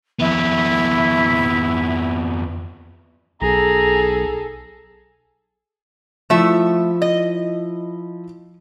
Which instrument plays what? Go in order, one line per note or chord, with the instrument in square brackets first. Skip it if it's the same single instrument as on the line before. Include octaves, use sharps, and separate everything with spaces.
[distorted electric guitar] F2 B3 [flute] E4
[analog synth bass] B1 [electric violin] G#4 A4 [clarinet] A#5
[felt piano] F3 E4 [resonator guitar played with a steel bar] A3 E5
[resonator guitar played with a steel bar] D#5